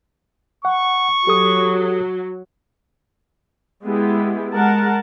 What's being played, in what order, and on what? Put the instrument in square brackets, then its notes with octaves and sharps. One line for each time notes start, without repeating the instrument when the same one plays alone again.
[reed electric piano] F#5 [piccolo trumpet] C#6
[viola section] F#3 [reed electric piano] G4 A4 D#6
[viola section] G#3 B3 E4 G4
G#3 A#4 F#5 A5